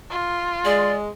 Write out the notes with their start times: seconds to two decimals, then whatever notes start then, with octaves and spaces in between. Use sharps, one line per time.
0.11 F4
0.65 G#3 D5